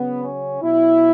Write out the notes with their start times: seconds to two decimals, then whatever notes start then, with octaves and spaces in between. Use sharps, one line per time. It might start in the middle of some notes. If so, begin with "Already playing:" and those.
Already playing: C#3 F#3 B3
0.23 C#4
0.62 B2 F#3 E4